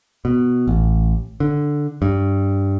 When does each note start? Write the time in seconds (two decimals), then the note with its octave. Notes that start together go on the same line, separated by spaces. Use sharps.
0.25 B2
0.68 A1
1.40 D3
2.02 G2